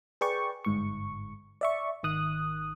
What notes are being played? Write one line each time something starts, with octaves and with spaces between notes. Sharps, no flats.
G#4 B4 D5 G5 C#6
G1 G#2 C#6
D5 E5 C#6
G#1 D#3 D#6 F#6